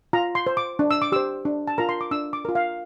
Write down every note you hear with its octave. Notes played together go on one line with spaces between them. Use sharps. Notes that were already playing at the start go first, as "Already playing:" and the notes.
F4 A#5
C6
C5
D6
D4
E6
D6
G4 C5 E6
D4
A5
F4 A#4 A#5
C6
D6
D4 E6
D6
F4 A#4
F5